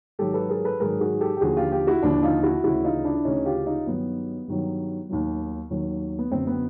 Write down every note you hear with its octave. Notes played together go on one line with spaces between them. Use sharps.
G#2 D#3 F#3 G4 A4
A4 B4
G#4 A#4
A4 B4
G#2 D#3 F#3 G#4 A#4
F#4 G#4
G4 A4
G4
D#2 D3 F3 F#4 G#4
F4 G4
F4 G4
E4 F#4
D#2 D3 F3 D4 E4
D#4 F4
E4 F#4
D2 C#3 E3 E4 F#4
D#4 F4
D4 E4
D2 C#3 E3 C#4 D#4
F4 G4
D#4 F4
G2 D#3 F#3 B3
G2 D#3 F#3
D#2 D#3 F#3
D#2 D#3 F#3
B3
F#2 D3 F#3 C4
B3